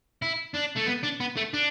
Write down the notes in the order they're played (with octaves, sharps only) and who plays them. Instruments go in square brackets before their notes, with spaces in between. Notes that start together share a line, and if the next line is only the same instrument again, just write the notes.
[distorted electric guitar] E4
D4
A3
B3
D4
B3
A3
D4